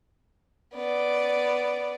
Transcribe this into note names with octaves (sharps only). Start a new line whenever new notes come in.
B3 D5